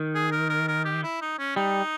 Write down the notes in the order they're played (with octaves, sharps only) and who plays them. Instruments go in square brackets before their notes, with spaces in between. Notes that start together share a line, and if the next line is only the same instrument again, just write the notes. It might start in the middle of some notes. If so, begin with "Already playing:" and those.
Already playing: [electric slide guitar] D#3
[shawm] G#4
A#4
A#4
A#4
G4
E4
D#4
C#4
[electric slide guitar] G3 [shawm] D#4